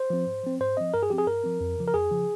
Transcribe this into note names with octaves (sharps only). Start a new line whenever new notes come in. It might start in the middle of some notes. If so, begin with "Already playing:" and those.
Already playing: C5
F3 C4
G#2
F3 C4
G#2 C5
F3 C4 D#5
G2 A#4
G#4
F3 C4 G4
G#4
G2 A#4
F3 C4
F2
C#3 F3
A#4
F2 G#4
C#3 F3